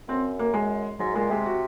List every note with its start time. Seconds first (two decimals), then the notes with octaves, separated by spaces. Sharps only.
0.08 F#2 C4
0.39 A#3
0.54 G#3
0.99 G#2 F#3
1.15 A#2 G#3
1.30 C3 G#3
1.46 F#4